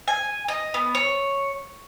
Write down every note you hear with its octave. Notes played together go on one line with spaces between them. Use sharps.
G#5
D#5
B3
C#5